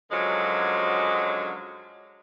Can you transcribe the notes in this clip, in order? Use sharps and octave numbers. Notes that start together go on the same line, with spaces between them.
F#2 D3 F3 F#3 G#3